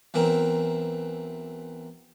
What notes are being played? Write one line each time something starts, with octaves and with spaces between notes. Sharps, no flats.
B1 E3 C4 A#4